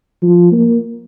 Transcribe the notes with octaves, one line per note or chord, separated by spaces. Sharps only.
F3
A#3